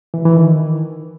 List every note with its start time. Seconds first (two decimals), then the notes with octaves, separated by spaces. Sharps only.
0.14 E3
0.25 E3
0.37 D#3